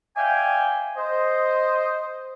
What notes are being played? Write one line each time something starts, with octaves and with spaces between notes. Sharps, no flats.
D5 E5 F5 G5 G#5
C5 D#5